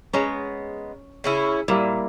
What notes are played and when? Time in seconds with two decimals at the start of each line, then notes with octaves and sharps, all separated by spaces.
0.14 G#3 B3 C#4 A#5
1.24 C#3 C#4 E4
1.68 A#2 G3 A#3 E4